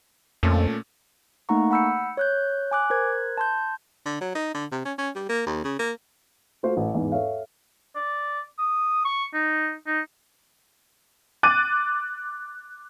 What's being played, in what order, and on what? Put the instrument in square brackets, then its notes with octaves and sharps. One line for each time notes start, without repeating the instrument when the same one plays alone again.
[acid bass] F2 [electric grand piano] A#2 A3 C#4
[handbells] A3 A#3 D#4 F#5 A#5 C#6
F#5 B5 E6 G6 C#7
C#5 F#6 G6
G#5 D6 F#6
A#4 C5 F#6 G#6
A5 C6 G6
[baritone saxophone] D3
F#3
D#4
D3
C3
C#4
C#4
G3
A#3
D#2
C#3
A#3
[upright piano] A3 F4 F#4 C5 F5
A1 A3
E2 G#2
A4 C#5 E5 F5
[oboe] D5
D#6
C#6
D#4
D#4
[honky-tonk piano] D6 F#6 A6 D#7